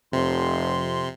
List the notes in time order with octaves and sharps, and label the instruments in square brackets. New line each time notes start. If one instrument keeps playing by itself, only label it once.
[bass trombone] F1 [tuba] F2 [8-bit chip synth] C3 [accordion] C6